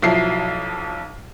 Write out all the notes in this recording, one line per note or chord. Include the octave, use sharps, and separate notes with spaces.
B1 F3 F#3 E4 C7